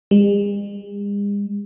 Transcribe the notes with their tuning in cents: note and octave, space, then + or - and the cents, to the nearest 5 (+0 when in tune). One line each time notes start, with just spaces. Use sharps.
G#3 -45